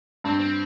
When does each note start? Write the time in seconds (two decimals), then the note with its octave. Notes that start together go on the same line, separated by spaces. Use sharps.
0.24 G2 C4
0.39 C4